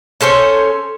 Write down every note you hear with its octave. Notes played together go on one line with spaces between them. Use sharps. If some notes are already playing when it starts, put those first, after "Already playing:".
C#4 A4 C5 C#5